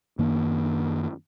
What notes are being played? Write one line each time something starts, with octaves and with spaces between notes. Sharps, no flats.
F#2 D#3 A#3